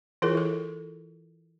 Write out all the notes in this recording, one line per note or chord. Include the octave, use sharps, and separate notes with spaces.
E3 E4 F4 G#4 A#4
E4 A4